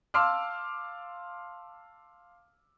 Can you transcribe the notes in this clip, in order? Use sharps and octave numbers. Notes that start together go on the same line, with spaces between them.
F5 A5 C6 D6 E6 F6